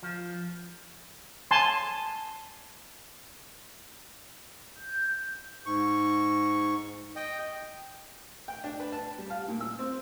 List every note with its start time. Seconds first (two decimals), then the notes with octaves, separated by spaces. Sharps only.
0.03 F3
1.51 G#5 A5 C6
4.77 G6
5.66 G#2 C#6
7.16 D#5 G5
8.48 G5
8.64 D4
8.80 B4
8.92 A5
9.18 G3
9.30 F5
9.48 A#2
9.60 E6
9.79 C4